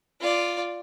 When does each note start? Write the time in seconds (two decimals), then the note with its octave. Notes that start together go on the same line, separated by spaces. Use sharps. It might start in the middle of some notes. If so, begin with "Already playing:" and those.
0.20 F4 D5